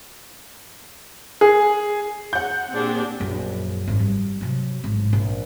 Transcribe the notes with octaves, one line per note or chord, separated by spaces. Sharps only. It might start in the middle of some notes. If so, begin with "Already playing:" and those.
G#4
F#5 G6
A#2 C4 D4 G4 G#4
A#1 F#2
G#1 F3
G3
C3 F#3
A1 G#2
A#1